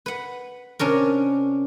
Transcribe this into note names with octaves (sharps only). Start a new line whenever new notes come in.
B4 F#5
C3 C#4 D4 A#4